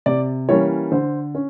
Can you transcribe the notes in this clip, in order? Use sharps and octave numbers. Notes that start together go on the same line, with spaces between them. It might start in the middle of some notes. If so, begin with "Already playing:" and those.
C3 D5
E3 G3 A#3 C#4 C#5
D3 C5
C#4